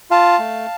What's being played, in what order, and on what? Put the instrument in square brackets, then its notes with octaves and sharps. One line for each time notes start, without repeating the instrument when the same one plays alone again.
[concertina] F4 F5 A5
A3